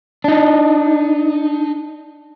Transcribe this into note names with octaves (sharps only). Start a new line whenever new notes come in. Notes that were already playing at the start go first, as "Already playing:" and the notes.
D4 D#4